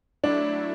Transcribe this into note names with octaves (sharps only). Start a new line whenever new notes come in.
F#3 A3 D4 E4